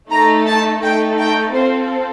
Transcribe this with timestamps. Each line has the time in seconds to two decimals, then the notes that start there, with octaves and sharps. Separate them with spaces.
0.11 A3 D#4 A4 A#5
0.47 A5
0.82 A3 D#4 A4 G5
1.19 G5
1.53 C4 F4 A4 C5